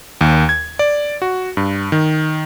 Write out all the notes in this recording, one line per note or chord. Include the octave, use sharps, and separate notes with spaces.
D#2
G#6
D5
F#4
G2
D#3